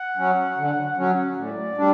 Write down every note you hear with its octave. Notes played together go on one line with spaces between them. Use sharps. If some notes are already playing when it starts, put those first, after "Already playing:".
Already playing: F#5
F#3 C#4
D3
F#3 C#4
A2 D5
G3 D4